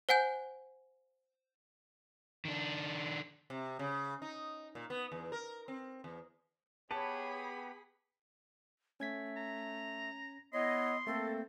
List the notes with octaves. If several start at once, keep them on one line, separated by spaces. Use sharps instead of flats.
C5 F#5 G#5 G6
D#3 D4
C3
C#3
D#4
A#2
B3
E2
A#4
C4
E2
B3 G4 G#4 B4 C#5 A5 B5
A3 C#4 G#6 B6
A#5
B3 E4 C#5 D#5 C6
A3 A#3 C4 A4